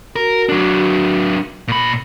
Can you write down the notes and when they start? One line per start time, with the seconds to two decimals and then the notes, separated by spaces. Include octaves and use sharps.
0.16 F#4 A#4
0.49 F#3 D4
1.68 A#2 B5